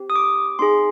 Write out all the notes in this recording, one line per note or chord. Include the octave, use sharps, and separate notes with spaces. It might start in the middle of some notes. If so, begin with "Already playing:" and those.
Already playing: C4 G4
D#6
D6
C4 D#4 G#4 C6